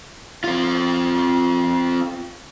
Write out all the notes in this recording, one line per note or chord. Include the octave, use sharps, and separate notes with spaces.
C4 F4